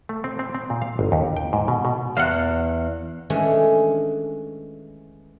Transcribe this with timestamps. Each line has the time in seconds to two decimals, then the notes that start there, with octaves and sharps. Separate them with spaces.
0.09 A3
0.24 C4
0.39 C4
0.55 C4
0.70 A#2
0.82 F5
0.99 G1
1.12 D#2
1.37 G5
1.53 G#2
1.68 B2
1.85 B2
2.17 E2 F5 F#5
3.30 D#3 E3 G#3 A3 C#4 D4